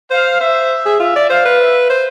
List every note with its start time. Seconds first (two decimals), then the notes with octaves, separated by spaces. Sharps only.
0.10 C5 F5
0.40 C5 E5
0.85 G#4
1.00 F4 E5
1.15 D5
1.30 C5 F5
1.45 B4
1.60 E5
1.89 C5